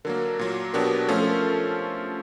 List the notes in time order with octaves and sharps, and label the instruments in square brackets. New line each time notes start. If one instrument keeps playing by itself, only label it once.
[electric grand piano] D3 F#3 A#3 [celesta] A#4
[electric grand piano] A#2 F#3 A#3
[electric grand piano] B2 F#3 B3 D4 G4 [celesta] A#4
[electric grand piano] F3 A3 C#4 F4 [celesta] A4
[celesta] A4
A#4